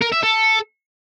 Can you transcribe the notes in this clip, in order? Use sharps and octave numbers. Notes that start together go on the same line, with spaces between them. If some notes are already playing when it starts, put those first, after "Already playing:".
A#4
E5
A4